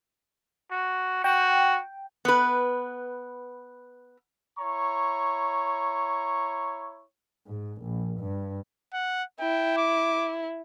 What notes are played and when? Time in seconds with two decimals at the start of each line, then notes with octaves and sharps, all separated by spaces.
0.71 F#4
1.24 F#4 G5
2.25 B3 B4
4.59 E4 C#5 A#5 C#6
7.47 G#2
7.82 A#1
8.20 G2
8.94 F#5
9.40 E4 G5
9.77 D6